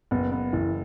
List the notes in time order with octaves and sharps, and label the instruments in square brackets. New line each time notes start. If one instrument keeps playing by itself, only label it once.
[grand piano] F#1 [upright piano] B3
[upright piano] B3
[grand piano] F#1 [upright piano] E3